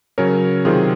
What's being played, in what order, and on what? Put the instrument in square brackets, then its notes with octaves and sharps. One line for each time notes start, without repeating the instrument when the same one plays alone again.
[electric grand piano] C#3 F#3 C#4 A#4 C#5
C3 D#3 F#3 C4 F4 G#4